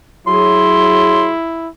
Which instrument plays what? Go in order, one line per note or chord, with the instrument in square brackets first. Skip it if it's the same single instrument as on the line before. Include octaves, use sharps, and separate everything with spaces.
[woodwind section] F#3 G#4 [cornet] E4 [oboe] C6